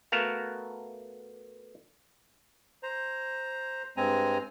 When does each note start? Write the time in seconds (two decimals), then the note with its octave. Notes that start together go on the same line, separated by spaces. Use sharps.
0.12 A3 B3 F#4 A#4 F5
2.83 C5 A#5
3.97 G2 G#3 C4 G#5 A#5